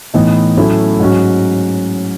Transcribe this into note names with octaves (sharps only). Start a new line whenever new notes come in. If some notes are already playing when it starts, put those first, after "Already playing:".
A2 E3 B3 D#4
A2 F#3 A3 C#4 E4
G#2 F#3 C#4 F#4